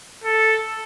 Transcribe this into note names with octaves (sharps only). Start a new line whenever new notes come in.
A4